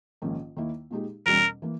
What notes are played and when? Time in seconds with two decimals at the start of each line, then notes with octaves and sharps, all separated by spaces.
0.22 A#1 G#2 D#3 A#3 C#4
0.56 D#2 D#3 A#3 E4
0.91 A#2 G#3 D#4 G4
1.26 E2 B2 G3 C#4 A#4
1.62 E3 A#3